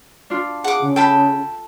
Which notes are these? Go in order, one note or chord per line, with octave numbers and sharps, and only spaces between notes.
D4 F4
G#4 F#5 D6
C#3
A4 G5 A5 B5